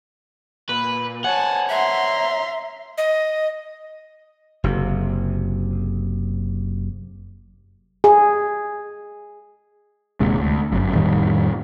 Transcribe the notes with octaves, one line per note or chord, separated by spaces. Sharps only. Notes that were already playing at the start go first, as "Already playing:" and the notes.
A#2 B4
C5 C#5 F#5 G#5 A5
E5 A#5 C6
D#5
F#1 C3
G#4
D#1 D#2 C3 G#3
D2
G1 F#2
F2 A2 D#3 G3